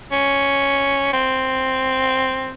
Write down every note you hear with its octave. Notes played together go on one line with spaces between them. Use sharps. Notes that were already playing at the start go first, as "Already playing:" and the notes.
C#4
C4